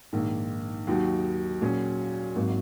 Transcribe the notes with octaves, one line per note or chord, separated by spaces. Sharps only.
A#1 G#2 D#3 A#3
D#2 D#3 F#3 D#4 F#4
A#2 F#3 C#4 G#4
G#1 G#2 F#3 A#3